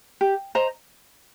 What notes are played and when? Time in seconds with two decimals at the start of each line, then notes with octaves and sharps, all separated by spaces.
0.21 G4
0.55 C5 D#5 A#5